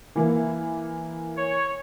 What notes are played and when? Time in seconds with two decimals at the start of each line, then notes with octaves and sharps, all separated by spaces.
0.16 E3 A#3
1.37 C#5